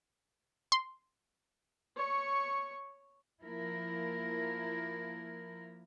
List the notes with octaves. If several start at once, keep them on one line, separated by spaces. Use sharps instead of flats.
C6
C#5 C#6
F3 A#3 E4 A#4